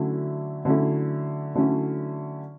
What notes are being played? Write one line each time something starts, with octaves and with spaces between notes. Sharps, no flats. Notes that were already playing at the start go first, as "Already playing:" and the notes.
Already playing: D3 F#3 A3 C#4 E4
D3 F#3 A3 C#4 E4
D3 F#3 A3 C#4 E4